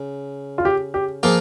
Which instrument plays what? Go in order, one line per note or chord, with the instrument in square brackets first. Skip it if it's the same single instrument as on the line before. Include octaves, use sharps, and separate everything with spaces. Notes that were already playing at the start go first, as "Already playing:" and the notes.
Already playing: [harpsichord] C#3
[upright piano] F4
G4
G4
[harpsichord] F3 A#3 F4 [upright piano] G#4